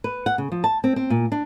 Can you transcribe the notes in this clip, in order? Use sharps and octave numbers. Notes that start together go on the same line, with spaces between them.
B4
F#5
C#3
F3
A5
C4
C4
A#2
D4